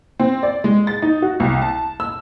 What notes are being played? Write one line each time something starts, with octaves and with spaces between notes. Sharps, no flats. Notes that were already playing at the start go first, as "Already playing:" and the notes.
C4
D5
G#3
A6
D#4
F#4
C2
A5
E6